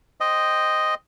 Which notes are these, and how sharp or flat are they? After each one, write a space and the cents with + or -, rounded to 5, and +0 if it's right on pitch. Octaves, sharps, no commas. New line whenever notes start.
C5 +0 D#5 +0 G5 +0